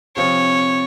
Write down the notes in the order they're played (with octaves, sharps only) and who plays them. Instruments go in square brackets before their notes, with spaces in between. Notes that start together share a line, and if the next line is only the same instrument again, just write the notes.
[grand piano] C3 F3 C4 [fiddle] C#5